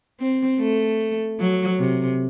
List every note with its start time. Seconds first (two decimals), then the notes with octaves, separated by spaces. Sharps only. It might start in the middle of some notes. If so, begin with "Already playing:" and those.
0.21 C4
0.60 A3
1.40 F#3
1.79 C3